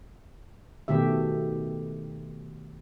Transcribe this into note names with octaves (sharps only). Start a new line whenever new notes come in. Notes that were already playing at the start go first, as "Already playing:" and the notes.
B2 D#3 A3 G4 E5